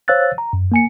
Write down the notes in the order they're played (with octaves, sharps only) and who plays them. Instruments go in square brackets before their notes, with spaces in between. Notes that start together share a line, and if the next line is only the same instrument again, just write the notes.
[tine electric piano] C5 C#5 F5 E6 F#6 A6
A#5
F#2
A#3 G#5 C#7